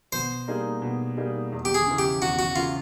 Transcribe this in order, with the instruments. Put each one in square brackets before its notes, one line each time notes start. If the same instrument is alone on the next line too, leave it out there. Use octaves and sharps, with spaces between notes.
[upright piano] B2 [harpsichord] C5
[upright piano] G3 A#3 D#4 G#4
B2
G3 A#3 D#4 G#4
E2
[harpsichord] G4
G#4
[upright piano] C#3 E3
[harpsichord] G4
[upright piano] E2 [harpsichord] F#4
[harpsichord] F#4
[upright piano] C#3 E3 [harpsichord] F4